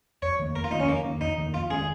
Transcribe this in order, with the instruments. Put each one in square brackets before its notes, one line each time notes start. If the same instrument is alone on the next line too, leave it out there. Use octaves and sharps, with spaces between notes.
[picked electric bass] F2 [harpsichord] C#5
[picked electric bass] D#3 A#3
[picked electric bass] F2 [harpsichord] A#4
[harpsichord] F4
[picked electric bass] A#3 [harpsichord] D#4
[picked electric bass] D#3
[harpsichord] C#4
[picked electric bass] F2 [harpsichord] A#3
[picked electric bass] D#3 A#3
[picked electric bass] F2 [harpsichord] D#4
[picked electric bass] D#3 A#3
[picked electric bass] F2 [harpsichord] F4
[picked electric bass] D#3 G#3 C#4 [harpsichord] G#4